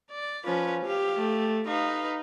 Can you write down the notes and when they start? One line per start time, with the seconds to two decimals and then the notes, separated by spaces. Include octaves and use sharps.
0.11 D5
0.45 F3 C#4 B4
0.86 G4 F5
1.16 A3
1.68 D#4 B4 F5